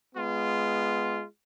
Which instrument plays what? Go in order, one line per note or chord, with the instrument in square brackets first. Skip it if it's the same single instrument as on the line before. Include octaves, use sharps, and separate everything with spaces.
[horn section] G#3 B3 F4